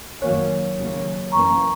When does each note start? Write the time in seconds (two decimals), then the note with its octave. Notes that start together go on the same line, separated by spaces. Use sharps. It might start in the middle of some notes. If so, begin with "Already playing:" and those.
0.21 F#2 D#3 F#3 A#3 C#4 C#5
0.77 D#2 C#3 F#3 A#3 C#4
1.32 F#2 E3 A#3 C#4 A#5 C#6